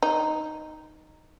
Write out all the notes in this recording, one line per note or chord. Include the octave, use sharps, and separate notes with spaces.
D#4